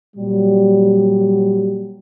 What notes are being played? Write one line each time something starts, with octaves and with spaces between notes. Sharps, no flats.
A#2 F#3 G3